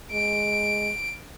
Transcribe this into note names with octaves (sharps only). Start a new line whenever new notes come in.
G#3 D7